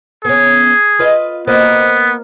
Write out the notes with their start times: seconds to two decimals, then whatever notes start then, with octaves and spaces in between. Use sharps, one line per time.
0.25 B3 C#4 G#4
0.99 F4 B4 D#5
1.47 A#3 B3 C5 D#5